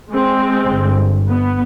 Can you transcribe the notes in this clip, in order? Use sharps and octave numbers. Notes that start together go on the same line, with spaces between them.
G#3 C4
G1
B3